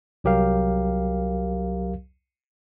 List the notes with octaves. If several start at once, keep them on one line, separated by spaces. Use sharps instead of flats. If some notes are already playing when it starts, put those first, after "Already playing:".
C2 F#3 G4 A#4 F5